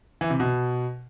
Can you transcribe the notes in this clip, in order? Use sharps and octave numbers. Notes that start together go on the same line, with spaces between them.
E3
C3
B2